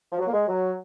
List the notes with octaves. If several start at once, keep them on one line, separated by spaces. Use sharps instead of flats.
F3
F#3
A#3
G#3
F#3